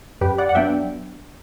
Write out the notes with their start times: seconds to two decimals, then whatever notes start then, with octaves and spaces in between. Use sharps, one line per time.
0.21 F#2 G4 B4
0.38 D5 F#5
0.49 F#5
0.55 F#3 B3 D4 E5 G5